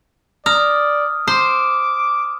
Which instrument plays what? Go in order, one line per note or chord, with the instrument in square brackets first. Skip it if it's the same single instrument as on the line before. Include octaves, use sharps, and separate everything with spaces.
[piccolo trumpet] D5 [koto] A#5 [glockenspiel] D#6 F6
[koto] C5 [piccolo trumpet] D6